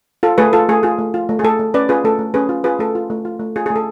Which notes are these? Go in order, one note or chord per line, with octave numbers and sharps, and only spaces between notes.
F4 A4
A3 G#4 B4
F4 A4
A3 G#4
F4 G#4
A3
F4
A3
G#4
A3 A4
A3
C#4 B4 D5
F4 G#4 B4
A3 A4
A3
C#4 G#4 B4
F4
F4 G#4 B4
A3 A4
F4
A3
F4
A3
F4 G#4
G#4
A3
A4